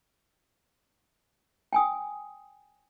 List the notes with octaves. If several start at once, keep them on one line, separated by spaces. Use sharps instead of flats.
G5 G#5 D#6